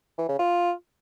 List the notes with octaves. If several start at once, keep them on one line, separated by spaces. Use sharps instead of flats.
E3
C#3
F4